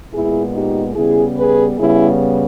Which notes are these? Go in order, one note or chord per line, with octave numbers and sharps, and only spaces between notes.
A#2 G#3 B3 E4 G#4
D#4 G4
C#3 G3 B3 E4 G#4
G#4 B4
C#3 G3 B3 E4 G#4